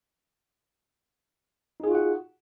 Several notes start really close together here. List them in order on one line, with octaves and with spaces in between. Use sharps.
D#4 G#4 F4 F#4 F#5